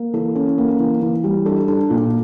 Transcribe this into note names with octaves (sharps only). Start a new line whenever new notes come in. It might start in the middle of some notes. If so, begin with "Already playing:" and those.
Already playing: A#3
E3 A4
C#4
A#3
E3
E3
G3
D4 A4
D4
A#2